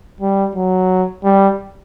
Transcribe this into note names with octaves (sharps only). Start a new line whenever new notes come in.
G3
F#3
G3